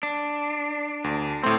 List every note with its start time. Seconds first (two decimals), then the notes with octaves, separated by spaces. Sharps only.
0.03 D4
1.04 D2
1.44 A2 A3 C4 C6